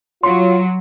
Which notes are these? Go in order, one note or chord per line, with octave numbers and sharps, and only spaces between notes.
F#3 F4 C#5 C6